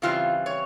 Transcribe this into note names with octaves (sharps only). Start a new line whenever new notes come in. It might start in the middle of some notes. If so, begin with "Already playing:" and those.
C#3 E3 G3 C4 F4
C#5